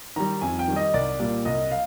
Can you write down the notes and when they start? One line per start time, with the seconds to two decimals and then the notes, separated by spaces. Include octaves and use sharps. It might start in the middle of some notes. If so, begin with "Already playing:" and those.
0.16 D#3 G3 A#5
0.41 F2 G#5
0.59 G5
0.68 D#3 G3
0.76 D#5
0.94 C2 D5
1.20 A#2 G3 A#3
1.45 C2 D#5
1.71 F5